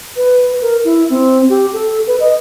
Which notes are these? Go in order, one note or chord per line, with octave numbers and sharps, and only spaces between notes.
B4
A#4
E4
C4
G4
A4
B4
D#5